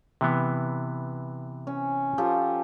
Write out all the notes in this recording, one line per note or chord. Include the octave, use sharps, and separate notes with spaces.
C3 E3 B3
C#4
F3 G4 A4